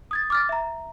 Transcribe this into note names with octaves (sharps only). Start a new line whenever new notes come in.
D#6 G#6 A6
D6 F6 A6
E5 A#5